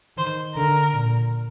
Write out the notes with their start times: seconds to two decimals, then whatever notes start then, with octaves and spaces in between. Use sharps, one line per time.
0.18 D#3 C5
0.56 D3 A#4
0.93 A#2